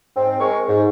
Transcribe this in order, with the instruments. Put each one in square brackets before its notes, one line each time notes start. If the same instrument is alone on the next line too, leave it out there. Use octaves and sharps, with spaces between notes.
[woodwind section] G#2 C4
G#3 A#4 C#6
G#2